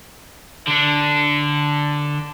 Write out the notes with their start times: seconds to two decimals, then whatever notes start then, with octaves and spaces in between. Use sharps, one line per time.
0.68 D3 D4